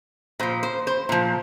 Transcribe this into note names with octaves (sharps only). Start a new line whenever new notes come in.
A#2 F3 C5
C5
C5
A#2 F3